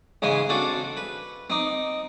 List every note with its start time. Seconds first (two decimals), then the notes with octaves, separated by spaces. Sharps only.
0.22 G#2 C#3 E3 C5 G#5 C6
0.49 C4 D4 F#4 A4
0.97 B4
1.50 C4 D#4 D6